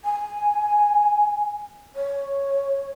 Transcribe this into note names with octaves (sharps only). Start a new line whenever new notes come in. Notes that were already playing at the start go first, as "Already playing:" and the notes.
G#5
C#5